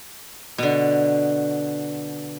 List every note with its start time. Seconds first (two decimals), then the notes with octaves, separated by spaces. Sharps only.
0.58 B2 D3